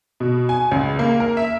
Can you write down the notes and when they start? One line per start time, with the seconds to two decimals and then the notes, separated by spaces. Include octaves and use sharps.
0.20 B2
0.49 G#5
0.71 C#2
0.99 A#3
1.20 A#4
1.37 E5